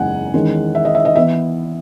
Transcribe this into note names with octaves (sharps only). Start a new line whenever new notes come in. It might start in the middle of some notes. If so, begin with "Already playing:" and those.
Already playing: F#1 E2 C#3 G#3 F#5 G#5
E2 D#3 G#3 C#4
E5
D#5
E5
D#5
E3 B3 E5